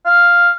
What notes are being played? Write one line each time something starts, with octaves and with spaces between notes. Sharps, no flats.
F5